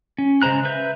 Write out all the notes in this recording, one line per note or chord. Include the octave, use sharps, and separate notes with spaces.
C#4
C#3 G#3 C5 A#5 F#6
B4 E5 G6